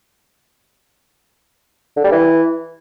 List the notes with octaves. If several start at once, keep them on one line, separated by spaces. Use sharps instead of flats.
D3
G3
E3